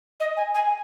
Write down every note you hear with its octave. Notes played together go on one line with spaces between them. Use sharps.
D#5
G#5
G#5